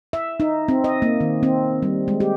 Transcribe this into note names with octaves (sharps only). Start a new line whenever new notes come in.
E5
D#4
C4
D#5
A#3
D#3
C4
G3
G#3
G4